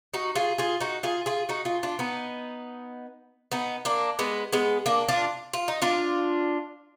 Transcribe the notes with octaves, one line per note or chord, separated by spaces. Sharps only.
D#4 F#4
F4 G#4
F4 G#4
D#4 F#4
F4 G#4
F4 G#4
D#4 F#4
F4 G#4
D4 F4
B3 D#4
B3 D#4
A#3 D4
G#3 B3
G#3 B3
A#3 D4
D4 F4
F4
D#4
D4 F4